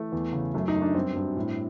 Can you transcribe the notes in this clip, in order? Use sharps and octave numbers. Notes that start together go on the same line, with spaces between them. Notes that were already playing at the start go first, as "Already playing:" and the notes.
Already playing: E3 A3
E2
C#3
F#2 A3
D#4
F#2
D4
G2 C4
G2
A2